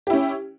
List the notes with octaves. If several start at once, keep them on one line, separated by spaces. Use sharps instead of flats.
C#4 E4 G4